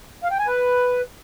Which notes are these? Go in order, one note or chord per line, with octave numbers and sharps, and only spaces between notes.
F5
G5
G#5
B4